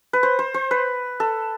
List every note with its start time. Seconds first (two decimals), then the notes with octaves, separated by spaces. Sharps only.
0.13 B4
0.23 C5
0.39 C5
0.54 C5
0.71 B4
1.20 A4